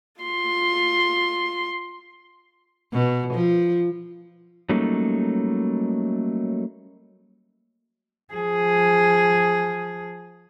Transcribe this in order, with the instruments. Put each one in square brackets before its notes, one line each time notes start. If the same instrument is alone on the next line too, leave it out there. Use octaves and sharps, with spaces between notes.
[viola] F4 C6
[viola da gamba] B2
F3
[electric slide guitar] F#3 G3 A3 A#3 C#4 D#4
[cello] F3 G#4